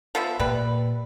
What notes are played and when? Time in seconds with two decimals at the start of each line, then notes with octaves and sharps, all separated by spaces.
0.15 F3 B3 E5
0.40 A#2 G3 B4